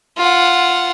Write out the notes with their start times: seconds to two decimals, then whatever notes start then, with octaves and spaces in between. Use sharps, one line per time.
0.17 F4 F#5